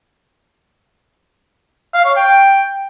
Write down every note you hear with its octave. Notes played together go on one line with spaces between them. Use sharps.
F5
C#5
G5